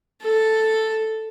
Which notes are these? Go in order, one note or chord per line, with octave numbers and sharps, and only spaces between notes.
A4